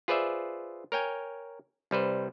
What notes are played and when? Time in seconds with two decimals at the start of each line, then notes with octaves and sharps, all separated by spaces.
0.08 F4 G#4 B4 C5 D5 E5
0.92 A#4 C#5 G5 G#5
1.91 C2 G3 B4 C5